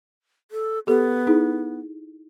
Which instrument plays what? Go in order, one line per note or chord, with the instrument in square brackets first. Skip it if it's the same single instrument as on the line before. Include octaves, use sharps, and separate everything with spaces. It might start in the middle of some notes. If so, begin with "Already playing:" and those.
[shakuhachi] A4
[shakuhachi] B3 [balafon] G4 A4
[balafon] D#4 E4 G#4